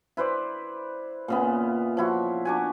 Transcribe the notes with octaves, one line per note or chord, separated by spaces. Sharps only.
E4 B4 C5 D5
A#2 C#3 B3
F3 E4 F#4
D4 F#4 G#5